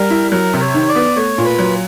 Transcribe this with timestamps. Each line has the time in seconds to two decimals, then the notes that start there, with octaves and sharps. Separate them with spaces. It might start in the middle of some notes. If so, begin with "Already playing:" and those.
Already playing: G3 A#4
0.11 E4
0.32 F#3 A#4
0.54 C3
0.61 C#5
0.74 D#3
0.89 D5
0.96 B3
1.16 A3 C#5
1.38 A#2
1.45 B4
1.58 F#3